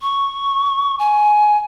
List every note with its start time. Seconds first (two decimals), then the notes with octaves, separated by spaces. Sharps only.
0.01 C#6
0.99 G#5